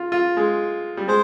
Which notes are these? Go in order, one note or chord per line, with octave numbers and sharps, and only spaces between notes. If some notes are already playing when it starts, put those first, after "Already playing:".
Already playing: F4
F4
G#3
G3
G#3 C5